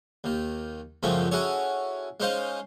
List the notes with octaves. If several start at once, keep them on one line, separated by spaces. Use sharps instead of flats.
D#2 D#3
C#2 F#2 F3 G#3 A3 C4
C#4 E4 F#4 G#4 A4 C#5
G#3 C#4 D#4 C5 F5